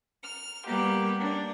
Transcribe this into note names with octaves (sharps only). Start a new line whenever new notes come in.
F6
G3 A#3 B3 G4
A#3 D4